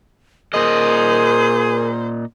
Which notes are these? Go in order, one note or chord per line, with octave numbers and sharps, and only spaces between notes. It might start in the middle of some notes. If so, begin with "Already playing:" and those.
A#2 G#4 A#4 C5 D#5